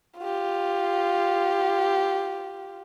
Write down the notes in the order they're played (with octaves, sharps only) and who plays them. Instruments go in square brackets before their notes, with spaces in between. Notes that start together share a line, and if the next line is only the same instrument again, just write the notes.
[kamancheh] F4 G4